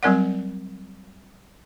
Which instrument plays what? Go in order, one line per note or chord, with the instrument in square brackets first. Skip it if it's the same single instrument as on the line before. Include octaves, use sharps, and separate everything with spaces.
[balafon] F#3 G3 C4 A#4 D5 F#5